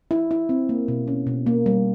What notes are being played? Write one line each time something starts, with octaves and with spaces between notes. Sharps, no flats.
E4
E4
C4
A#3
B2
C#4
B2
A#3
G3